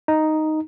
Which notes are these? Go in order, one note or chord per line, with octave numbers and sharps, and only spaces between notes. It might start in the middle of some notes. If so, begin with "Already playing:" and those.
D#4